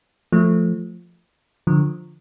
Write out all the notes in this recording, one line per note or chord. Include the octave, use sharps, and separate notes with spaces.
F3 A3
D3 F3